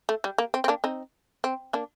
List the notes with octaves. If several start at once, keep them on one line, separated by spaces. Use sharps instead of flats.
A3
G3
A#3
C4
C4
A#3 D4
C4 D#4
C4
A#3 D4